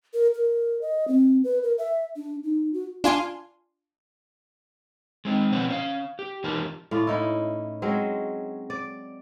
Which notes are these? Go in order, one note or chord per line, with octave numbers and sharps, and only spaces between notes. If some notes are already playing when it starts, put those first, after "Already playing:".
A#4
A#4
D#5
C4
B4
A#4
E5
D4
D#4
F#4
D4 F4 G#5 C6
G#3 C4 D#4
B2 F3 C4 B4 C5 F#5
C#4 D4 F5
G4
E3 D#4 F4 G4 A#4 A5
A2 D4 F4
C#4 D#4 E4
F#3 G#3 C4 C#4
D5